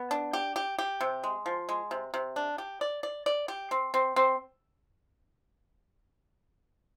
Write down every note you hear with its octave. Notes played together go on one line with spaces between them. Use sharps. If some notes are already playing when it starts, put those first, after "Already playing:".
Already playing: B3
D4
G4
G4
G4
C3
G#3
F3
G#3
C3
C3
D4
G4
D5
D5
D5
G4
C4
C4
C4